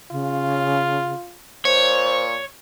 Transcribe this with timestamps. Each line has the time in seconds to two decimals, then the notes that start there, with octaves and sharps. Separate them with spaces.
0.11 C#3 F4
1.65 A#2 C5 C#5